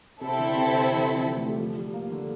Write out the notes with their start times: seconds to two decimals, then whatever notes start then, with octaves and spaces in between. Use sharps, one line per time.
0.21 C3 C4 E4 A4
0.39 D3
0.56 C3
0.91 E3
1.13 F3
1.36 A3
1.48 G3
1.60 F3
1.78 G3
1.94 A#3
2.12 D3